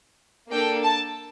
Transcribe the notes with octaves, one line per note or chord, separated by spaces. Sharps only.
A#3 D4 A4 G5
A5